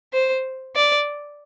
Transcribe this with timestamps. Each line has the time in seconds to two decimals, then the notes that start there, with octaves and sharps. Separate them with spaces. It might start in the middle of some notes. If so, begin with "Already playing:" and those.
0.13 C5
0.76 D5